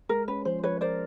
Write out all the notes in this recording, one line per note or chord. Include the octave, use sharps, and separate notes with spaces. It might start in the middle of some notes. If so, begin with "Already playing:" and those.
G#3 A#4
C#4 B4
F3 C5
F3 B4 C#5
A#4 C5 D5